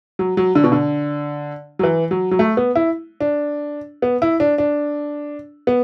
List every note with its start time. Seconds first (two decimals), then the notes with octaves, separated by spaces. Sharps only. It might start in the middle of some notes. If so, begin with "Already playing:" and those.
0.19 F#3
0.37 F#3
0.55 D3
0.64 B2
0.72 D3
1.79 F#3
1.83 E3
2.11 F#3
2.31 F#3
2.39 A3
2.57 B3
2.75 E4
3.20 D4
4.02 B3
4.22 E4
4.40 D4
4.58 D4
5.67 B3